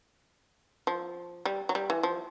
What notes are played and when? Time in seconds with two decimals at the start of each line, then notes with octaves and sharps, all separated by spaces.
0.87 F3
1.45 G3
1.69 F#3
1.75 G3
1.90 E3
2.03 F3